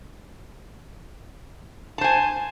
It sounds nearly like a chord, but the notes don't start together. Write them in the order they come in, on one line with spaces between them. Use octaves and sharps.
A5 C5 G#5